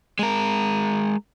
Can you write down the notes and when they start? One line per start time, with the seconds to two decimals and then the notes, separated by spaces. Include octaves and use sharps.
0.19 G#3 A#4